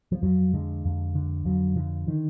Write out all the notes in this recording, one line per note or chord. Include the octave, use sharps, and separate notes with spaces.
F3
F2 F#3
D3 G#3
F2
D3
F2 F#3
D3 F3
D#3